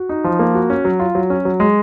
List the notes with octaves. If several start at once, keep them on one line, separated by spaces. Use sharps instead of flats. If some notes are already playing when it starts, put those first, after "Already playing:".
Already playing: F#4
D#4
F3
A#3
F#4
C#4
F#3
F4
F#3
C#4
F#3
G#3